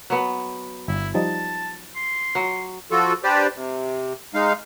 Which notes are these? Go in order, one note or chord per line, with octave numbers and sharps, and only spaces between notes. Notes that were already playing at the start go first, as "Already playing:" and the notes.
F#3 B3
G1 E4
F3 G3 D#4 A5
C6
F#3
F3 F4 F#4 A4
D4 G4 B4 C5 D5
C3
G#3 D#4 F5